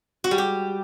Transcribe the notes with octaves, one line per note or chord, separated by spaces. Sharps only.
F#4
G3
G4